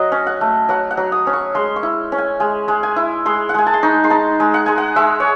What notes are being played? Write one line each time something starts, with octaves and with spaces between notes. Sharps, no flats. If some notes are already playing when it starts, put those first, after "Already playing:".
Already playing: F#3 D#5 F#5
C#4
F#5
A3
F#3 F#5
F#5
F#3
D#6
C#4
C#6
G#3 C6
C#6
E4
C#4
G#5
G#3 G#5
G#3
G#5
E4
G#3 C6
F#5
G#3 G#5
A5
C6
D#4 C#6
C6
D#4 A5
G#3
F#5
G#3 G#5
F#5
G#3 E5
C#5